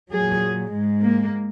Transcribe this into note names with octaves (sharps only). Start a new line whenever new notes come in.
A#2 F#3 G#4
G#2 G#3
A#3